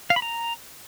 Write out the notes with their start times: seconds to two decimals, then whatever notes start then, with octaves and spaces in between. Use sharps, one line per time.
0.10 F5
0.16 B5
0.22 A#5